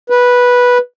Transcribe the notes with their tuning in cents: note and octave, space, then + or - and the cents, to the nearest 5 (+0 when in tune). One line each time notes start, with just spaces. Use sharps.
B4 -10